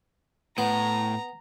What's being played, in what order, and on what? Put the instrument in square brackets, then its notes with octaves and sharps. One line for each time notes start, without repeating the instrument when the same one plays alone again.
[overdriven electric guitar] A2 [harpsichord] B3 [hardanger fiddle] A#5